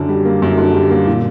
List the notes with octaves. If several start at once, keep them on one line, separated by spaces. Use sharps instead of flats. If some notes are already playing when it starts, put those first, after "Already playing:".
Already playing: F#2 D3
G3
A#3
F#2
D3
G3
A#3
A#2